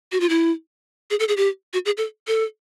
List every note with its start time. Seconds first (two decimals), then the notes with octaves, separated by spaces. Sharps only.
0.12 F#4
0.20 F4
0.29 E4
1.10 G#4
1.19 A4
1.28 G#4
1.37 G4
1.73 F#4
1.86 G#4
1.97 A4
2.27 A4